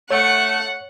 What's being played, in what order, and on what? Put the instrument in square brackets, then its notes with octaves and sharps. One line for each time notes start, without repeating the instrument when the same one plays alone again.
[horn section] A3 [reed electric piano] C#5 [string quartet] F#5